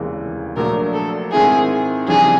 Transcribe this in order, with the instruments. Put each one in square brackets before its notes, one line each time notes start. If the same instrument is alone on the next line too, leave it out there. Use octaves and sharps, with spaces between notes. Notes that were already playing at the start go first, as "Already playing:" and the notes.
Already playing: [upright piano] F1 D#2 C#3 E3 G#3
[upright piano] A#1 A#2 F#3 A3 D4 [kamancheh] A#4
[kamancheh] A4
[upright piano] G#2 D#3 G#3 C4 E4 [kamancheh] G#4
[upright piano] F2 C#3 E3 G3 [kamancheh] G#4